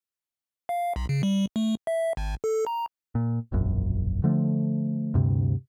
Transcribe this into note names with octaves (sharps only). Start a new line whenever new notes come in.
F5
B1
C#3
G3
A3
E5
G#1
A4
A#5
A#2
E1 A#1 F#2
D3 F3 A3
D2 G2 C3